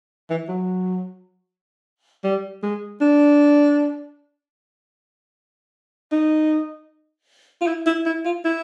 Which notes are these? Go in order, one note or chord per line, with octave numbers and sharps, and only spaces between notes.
E3
F#3
G3
G#3
D4
D#4
F4
E4
E4
E4
F4
E4